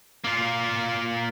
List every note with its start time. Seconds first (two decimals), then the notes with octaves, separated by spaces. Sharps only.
0.24 A#3 F4